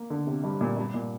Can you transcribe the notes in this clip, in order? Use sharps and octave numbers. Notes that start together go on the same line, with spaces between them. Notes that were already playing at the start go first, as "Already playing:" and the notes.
Already playing: A#3
D3
C3
G2
A#2
G2
A#2